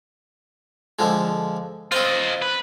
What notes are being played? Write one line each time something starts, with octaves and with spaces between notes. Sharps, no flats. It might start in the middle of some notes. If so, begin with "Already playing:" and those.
D3 F3 G#3
C4 F4 C5 D#5
B4